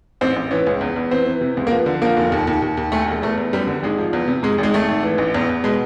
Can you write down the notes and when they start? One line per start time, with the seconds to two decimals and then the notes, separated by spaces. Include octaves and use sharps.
0.21 A1 C4
0.36 A1
0.51 E3 C#4
0.67 C#2
0.81 E2
0.96 E2
1.11 E3 C4
1.26 E3
1.41 C3
1.57 C#2
1.67 A#3
1.71 F3 B3
1.86 D3
2.02 F3 A#3
2.17 F1
2.32 D#2
2.47 D#2
2.62 D#2
2.77 D#2
2.92 D2 A3
3.08 E1
3.22 E2 A3
3.38 E2
3.53 F#2 G3
3.67 D3
3.83 G#1 G#3
3.98 F3
4.13 E2
4.28 C3
4.43 G#2 G#3
4.58 G#1
4.63 G#3
4.74 G#1 A3
4.88 G#1
5.03 E3
5.18 A1
5.34 E2
5.49 E2
5.64 B2 G#3